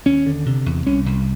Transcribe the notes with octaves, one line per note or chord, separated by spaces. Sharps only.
D#2 C#4
D3
C3
E2
C2 C#4
C2